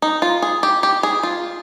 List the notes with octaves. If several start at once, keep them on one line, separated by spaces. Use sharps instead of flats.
D#4
F4
G#4
G4
G4
G#4
F4